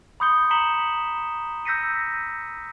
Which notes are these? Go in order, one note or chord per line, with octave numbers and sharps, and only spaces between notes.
B5 C6 D#6 G6 C#7 G7
A#5 B6 C#7 E7 F#7 G7
E6 G6 A#6 B6 C#7 D#7